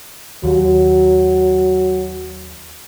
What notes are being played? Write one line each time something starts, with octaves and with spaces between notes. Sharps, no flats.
D#2 F#3